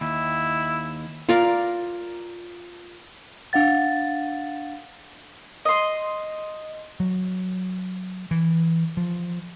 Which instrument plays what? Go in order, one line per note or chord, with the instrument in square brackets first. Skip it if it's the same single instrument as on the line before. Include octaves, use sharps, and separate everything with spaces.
[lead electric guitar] D#2 [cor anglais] E4
[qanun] F4 A#4 D5 F5
[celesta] D4 F5 F#5 A6
[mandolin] D#5 C6
[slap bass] F#3
E3
F3